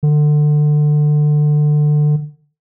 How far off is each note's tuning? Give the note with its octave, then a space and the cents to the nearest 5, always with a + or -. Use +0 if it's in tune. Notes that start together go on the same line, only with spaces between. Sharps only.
D3 +25